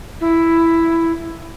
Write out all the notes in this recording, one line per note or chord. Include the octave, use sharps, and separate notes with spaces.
E4